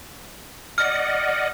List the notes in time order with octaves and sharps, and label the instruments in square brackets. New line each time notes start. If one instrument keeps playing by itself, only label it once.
[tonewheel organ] D5 D#5 F#5 [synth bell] F6